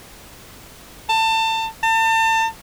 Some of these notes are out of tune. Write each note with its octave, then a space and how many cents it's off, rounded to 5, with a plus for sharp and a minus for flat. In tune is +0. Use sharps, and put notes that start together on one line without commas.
A5 +25
A5 +35